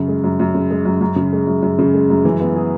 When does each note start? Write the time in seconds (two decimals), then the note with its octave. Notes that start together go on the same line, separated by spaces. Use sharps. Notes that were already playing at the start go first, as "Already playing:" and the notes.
Already playing: F#2 C#3
0.08 G#3
0.24 F#2
0.40 F#2
0.54 C#3
0.71 G#3
0.85 F#2
1.01 F#2
1.16 C#3
1.33 G#3
1.47 F#2
1.63 F#2
1.79 C#3
1.94 G#3
2.10 F#2
2.25 E3
2.40 B3
2.56 G#4